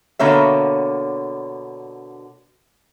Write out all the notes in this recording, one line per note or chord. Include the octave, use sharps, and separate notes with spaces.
B2 D3 A#3 C#5 E5